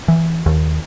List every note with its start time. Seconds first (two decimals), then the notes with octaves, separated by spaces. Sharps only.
0.08 E3
0.46 D#2